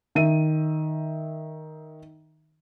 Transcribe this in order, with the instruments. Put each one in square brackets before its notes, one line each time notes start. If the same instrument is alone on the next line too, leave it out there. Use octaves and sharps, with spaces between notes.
[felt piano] D#3 E5 D#7